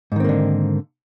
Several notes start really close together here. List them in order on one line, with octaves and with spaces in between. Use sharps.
G#2 D#3 C4 A#3 D3